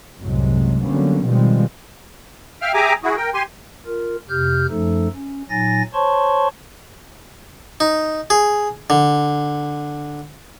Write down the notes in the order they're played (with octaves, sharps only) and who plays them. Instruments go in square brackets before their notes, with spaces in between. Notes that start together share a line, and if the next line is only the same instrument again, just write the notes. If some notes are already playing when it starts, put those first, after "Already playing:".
[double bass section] C2 F#2 A2 C3 F#3 G#3
D3 F#3 G3 A#3 B3 C#4
B2 D#3 F3 G3 G#3 C4
[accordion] E5 F5 G5 F6
G4 G#4 E5 G#5 A#5 D6
E4 F#4 G#4
A#4 G5
G4 G#5 C6
[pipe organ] F4 A#4
F2 C3 G4 F6 G6
F#2 F3 A3 D#4 A4
C#4
A#2 F#3 D#4 G#5 A6 A#6
C5 C#5 A5 C6 C#6
[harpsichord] D#4
G#4
D3